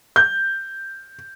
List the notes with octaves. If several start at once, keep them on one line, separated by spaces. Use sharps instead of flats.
G6